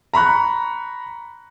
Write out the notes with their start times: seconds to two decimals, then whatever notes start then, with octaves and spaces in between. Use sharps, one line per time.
0.13 A#5 B5 C#6 F#6